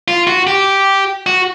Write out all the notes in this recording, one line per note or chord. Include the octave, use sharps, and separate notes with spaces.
F4
F#4
G4
F#4